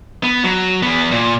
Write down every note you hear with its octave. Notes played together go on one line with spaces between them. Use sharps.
B3
F#3
E3 B3
A#2